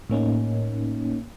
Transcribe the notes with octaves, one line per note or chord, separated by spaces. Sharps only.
A2 A#3 C#4 D#4